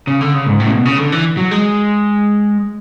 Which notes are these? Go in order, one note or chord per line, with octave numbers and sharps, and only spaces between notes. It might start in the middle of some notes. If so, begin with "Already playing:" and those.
C#3
D3
C#3
G#2
A2
C#3
B2
C#3
D3
E3
F#3
G#3